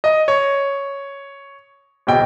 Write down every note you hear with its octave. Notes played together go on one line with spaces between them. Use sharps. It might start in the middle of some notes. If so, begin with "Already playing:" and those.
D#5
C#5
D1 B1 G5